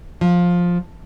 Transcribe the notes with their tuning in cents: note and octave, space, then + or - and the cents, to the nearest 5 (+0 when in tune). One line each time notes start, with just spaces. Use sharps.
F3 +10